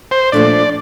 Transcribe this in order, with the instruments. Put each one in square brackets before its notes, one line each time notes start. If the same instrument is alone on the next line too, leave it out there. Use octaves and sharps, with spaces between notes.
[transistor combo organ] C5
[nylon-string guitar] A#2 F3 A3 D4 [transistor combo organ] D5